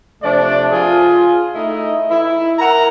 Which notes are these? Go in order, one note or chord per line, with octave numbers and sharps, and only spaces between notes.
C3 F3 A3 D4 D5
F4 G#4
A3 D#4 E4 D#5
E4
A#4 F#5 A#5